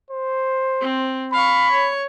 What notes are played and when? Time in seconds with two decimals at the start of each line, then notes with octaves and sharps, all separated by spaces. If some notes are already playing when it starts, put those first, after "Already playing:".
0.10 C5
0.81 C4
1.33 F5 B5 C#6
1.72 C#5